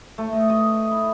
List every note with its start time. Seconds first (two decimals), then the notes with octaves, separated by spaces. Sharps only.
0.18 A3
0.33 D#5
0.50 D#5
0.91 E4